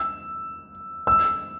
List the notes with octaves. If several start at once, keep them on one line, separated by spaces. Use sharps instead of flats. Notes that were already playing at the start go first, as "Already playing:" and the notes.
Already playing: E6
E6